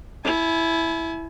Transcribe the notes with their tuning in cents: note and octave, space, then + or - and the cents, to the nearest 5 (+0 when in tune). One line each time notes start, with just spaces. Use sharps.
E4 +0 G#5 +45